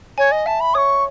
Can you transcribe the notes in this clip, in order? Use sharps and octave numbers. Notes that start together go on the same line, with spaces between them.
C#5 G#5
D#5
E5 A5
B5
C#5 C#6 D#6